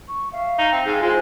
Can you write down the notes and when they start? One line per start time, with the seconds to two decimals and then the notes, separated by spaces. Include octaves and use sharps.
0.08 C#6
0.31 E5 F5
0.58 D#4
0.72 C4 E5
0.86 G#2 F5 G#5
1.02 G#3 E4 F4 C5